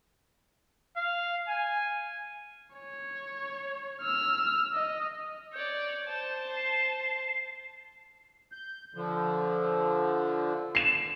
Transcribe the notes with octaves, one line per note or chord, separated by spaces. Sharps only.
F5
G#5
C#5
E6 F6
D#5
C#5 D5 G6
C5 A5
C7
G6
D3 F3
C7 E7